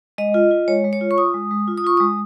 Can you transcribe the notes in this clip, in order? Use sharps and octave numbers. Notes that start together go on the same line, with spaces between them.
G#3 D#5
F4
F4
G#3 C#5
G#3
C#5
F4
C#6
F4 D#6
G#3
G#3
F4
D#6
F4 C#6
G#3 D#6